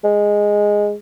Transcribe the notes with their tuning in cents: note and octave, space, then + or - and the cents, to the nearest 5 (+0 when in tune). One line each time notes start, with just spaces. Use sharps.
G#3 -5